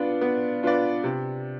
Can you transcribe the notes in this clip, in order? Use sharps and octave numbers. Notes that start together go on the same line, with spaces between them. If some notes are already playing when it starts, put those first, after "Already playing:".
Already playing: B3 D4 F4 B4 D5
B3
D4 F4 B4 D5
C3